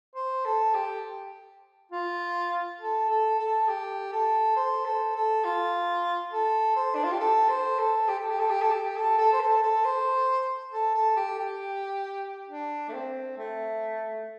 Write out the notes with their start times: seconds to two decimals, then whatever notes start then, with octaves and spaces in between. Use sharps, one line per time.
0.15 C5
0.45 A4
0.74 G4
1.92 F4
2.80 A4
3.09 A4
3.39 A4
3.68 G4
4.12 A4
4.56 C5
4.85 A4
5.15 A4
5.44 F4
6.32 A4
6.76 C5
6.95 D4
7.04 F4
7.12 G4
7.20 A4
7.49 C5
7.79 A4
8.08 G4
8.19 A4
8.29 G4
8.39 A4
8.50 G4
8.61 A4
8.71 G4
8.96 A4
9.18 A4
9.33 C5
9.41 A4
9.62 A4
9.85 C5
10.72 A4
10.95 A4
11.16 G4
11.39 G4
12.49 D4
12.89 A3
12.94 C4
13.38 A3